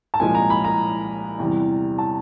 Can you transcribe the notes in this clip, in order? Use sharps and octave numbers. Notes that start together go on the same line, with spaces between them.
A5
C2 A#2 F3 G#3 G#5
A#5
B5
A#5
E2 C3 E3 G3
A5